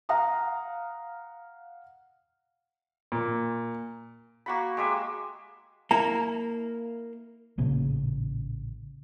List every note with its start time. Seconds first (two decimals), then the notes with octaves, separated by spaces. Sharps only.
0.09 F5 F#5 A#5 D#6
3.12 A#2
4.46 A#3 F#4 B5
4.77 G#3 G4 E5
5.91 A#3 E4 A#5
7.58 A1 A#2 C#3 A#3